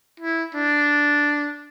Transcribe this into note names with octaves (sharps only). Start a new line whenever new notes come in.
E4
D4